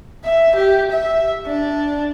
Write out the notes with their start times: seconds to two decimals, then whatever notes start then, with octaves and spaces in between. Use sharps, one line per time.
0.24 E5
0.55 G4
0.91 E5
1.46 D4